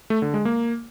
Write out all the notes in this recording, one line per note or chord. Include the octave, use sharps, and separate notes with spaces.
A3
D3
G#3
A#3